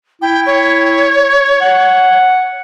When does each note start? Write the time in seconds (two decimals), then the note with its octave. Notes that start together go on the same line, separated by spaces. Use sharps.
0.22 E4 G5
0.46 C#5
1.61 F#5